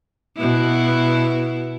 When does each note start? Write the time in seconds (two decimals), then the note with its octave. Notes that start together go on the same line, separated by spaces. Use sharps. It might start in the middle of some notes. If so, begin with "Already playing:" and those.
0.37 B2 B3 E4